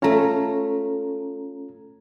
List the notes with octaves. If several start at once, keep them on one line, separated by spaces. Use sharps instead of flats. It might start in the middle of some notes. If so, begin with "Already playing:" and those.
A3 C#4 F4 C#5 A#5